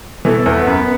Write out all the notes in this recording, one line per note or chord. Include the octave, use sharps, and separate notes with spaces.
B2 E3 A4
E2
B3
F#2